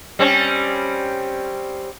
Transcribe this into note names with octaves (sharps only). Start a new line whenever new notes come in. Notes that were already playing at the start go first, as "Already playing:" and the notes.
G3 C4 C#4